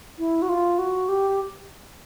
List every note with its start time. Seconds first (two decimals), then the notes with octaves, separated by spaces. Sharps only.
0.19 E4
0.42 F#4
0.49 F4
0.79 F#4
1.08 G4